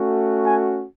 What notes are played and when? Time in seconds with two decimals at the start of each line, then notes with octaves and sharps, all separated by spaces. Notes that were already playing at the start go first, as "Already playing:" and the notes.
Already playing: A3 C#4 F#4
0.44 G#5